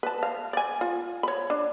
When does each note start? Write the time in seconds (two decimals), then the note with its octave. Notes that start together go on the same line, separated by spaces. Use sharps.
0.03 B4 A5
0.23 F5
0.53 D5 G#5
0.81 F4
1.23 C#5 B5
1.50 D4